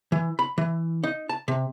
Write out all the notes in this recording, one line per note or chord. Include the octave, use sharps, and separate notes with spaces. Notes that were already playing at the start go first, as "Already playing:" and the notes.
E3
B5
E3
D#4
A5
C3